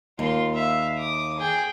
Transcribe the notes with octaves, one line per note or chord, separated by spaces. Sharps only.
D#2 F4 C6
E5 F5
D6 D#6
G#4 G5